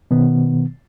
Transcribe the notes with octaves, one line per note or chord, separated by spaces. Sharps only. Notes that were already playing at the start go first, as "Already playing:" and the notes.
B2 D#3 B3